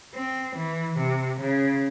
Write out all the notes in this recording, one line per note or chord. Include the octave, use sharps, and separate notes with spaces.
C4
E3
C3
C#3